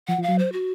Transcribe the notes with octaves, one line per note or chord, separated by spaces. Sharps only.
F3 F#5
F3
F5
F#3
C5
F#4